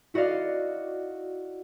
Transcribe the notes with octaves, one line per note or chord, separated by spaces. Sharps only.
E4 F#4 D5 D#5 F5